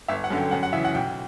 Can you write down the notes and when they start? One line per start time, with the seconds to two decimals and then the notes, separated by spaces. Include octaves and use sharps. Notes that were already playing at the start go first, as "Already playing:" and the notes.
0.08 G1 E5
0.24 F#5
0.30 F#2 D3
0.38 G5
0.51 F#2 F#5
0.63 F#5
0.73 C#3 E3 E5
0.85 F#5
0.94 B1 G5